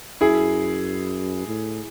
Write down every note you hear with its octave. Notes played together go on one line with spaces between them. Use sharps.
F#2 E4 G#4
A2